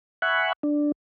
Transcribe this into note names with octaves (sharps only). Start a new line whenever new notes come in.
E5 F#5 G#5 B5 C#6 F#6
D4